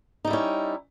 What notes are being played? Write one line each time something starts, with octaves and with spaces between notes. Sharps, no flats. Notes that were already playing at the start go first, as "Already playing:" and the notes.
G3 C#4 D#4 E4